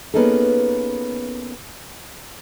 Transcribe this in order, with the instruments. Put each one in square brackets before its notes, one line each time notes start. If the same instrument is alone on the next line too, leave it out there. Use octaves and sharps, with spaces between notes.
[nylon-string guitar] A#3 B3 C#4 D#4 G#4 A4